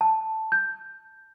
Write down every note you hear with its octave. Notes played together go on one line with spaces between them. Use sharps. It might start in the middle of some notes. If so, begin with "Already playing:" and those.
A5
G6